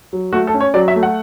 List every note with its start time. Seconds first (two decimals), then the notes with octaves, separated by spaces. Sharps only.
0.13 F#3
0.33 A3 F#4
0.47 A4
0.54 C#4
0.61 C#5
0.74 F#3 D5
0.88 E5
0.96 A3
1.03 F#5